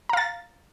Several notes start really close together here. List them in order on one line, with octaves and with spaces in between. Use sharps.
A#5 F5 A6